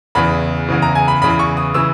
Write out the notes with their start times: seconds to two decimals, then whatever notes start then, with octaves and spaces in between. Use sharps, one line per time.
0.15 E2 C#3 E3 B5
0.69 E2 C#3 E3
0.82 A#5
0.95 G#5
1.08 B5
1.22 E2 C#3 E3 B5
1.39 C#6
1.57 D#6
1.74 C#3 E3 E6